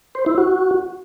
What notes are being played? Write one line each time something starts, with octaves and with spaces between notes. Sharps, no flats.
C5
E4
F#4